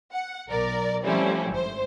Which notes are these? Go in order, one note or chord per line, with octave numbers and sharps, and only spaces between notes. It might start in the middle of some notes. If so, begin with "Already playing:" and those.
F#5
B1 A#4 D5
F3 G3 A3 C4 C#4 E4
G#1 C5